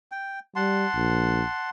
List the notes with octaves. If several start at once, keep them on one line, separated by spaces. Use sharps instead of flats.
G5
G3 F#5 A5 C6
A#1